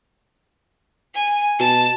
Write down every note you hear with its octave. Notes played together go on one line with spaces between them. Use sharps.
G#5
B2 A5